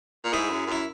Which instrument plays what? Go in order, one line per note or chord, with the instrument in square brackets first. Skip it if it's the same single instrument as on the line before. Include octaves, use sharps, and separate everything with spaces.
[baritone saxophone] A#2
[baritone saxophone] G#2 [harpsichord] E4 G#4
[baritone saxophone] F#2
[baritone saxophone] F#2 [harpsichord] E4